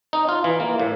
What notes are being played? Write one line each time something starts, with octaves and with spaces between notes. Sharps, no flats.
D#4
F4
E3
A#3
A2